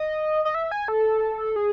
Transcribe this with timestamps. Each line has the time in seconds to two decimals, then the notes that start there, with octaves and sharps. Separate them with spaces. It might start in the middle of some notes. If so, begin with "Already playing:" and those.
Already playing: D#5
0.45 D#5
0.55 E5
0.71 G#5
0.88 A4
1.56 G#4